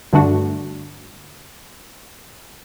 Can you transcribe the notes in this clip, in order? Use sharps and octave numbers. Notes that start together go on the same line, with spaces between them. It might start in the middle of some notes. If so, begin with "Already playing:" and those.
G2 D3 A3 D4 F#4